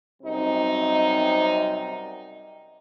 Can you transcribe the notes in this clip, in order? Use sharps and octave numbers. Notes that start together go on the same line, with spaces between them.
F#2 C3 G3 C4 D#4